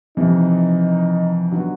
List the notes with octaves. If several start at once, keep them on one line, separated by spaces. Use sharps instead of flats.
F2 C3 E3 D#4
D3 F#3 B3 D#4 F#4